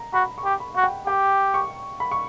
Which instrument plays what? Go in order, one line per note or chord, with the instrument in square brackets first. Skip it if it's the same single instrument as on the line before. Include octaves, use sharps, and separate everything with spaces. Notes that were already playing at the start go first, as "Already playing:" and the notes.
Already playing: [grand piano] A#5
[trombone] F#4 [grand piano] B5
[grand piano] C#6
[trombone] G4
[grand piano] B5
[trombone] F#4 [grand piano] F#5
[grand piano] G5
[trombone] G4 [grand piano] G5
[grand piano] C#6
B5
C#6